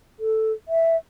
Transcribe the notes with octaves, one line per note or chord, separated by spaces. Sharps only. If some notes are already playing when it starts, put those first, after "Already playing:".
A4
E5